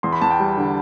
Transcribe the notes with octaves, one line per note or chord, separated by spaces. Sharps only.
E2 C6
B5
E2 A5
G5
G3
D3